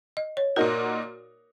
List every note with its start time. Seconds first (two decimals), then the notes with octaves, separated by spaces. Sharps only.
0.17 D#5
0.37 C#5
0.56 A#2 A#3 D#4 F#4 A#4